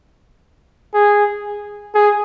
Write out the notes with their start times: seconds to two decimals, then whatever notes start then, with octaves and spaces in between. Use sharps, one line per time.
0.94 G#4
1.95 G#4